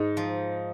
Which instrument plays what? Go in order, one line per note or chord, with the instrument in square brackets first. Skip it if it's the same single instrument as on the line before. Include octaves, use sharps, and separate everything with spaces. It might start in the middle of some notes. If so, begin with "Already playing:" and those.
Already playing: [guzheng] G#2 [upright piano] D#4
[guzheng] F3